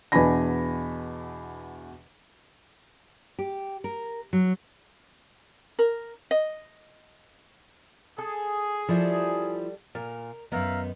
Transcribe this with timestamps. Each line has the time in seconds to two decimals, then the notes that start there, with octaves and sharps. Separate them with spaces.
0.12 E2 B2 D4 G#5 B5 A#6
3.39 G4
3.84 A#4
4.33 F#3
5.79 A#4
6.31 D#5
8.18 G#4 A4
8.88 F3 G3 E4 A4
9.95 A#2 A#4
10.52 F#2 D#3 B3 E5 F5 A#5